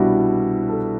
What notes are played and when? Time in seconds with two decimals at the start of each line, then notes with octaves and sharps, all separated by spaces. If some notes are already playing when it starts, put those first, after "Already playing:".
Already playing: C2 B2 G3 D4 E4 F#4
0.69 A4